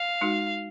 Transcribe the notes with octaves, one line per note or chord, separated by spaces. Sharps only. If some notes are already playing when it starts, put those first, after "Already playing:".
Already playing: F5
G#3 D#4 F#4